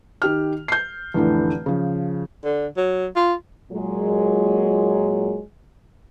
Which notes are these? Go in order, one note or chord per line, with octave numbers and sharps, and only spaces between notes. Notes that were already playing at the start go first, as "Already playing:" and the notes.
D#3 G4 F6
G6 C7
F1 A2 D3 E3
C#3 F3
D3
F#3
F4
A#2 F#3 G#3